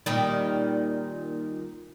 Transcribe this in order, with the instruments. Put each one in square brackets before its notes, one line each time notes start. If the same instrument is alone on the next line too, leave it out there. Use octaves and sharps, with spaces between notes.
[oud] A#2 D#3 G3